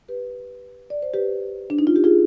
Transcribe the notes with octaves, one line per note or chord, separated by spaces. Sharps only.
G4 B4
D5
C5
G4 B4
D4
D#4
F4
G4
F4 G#4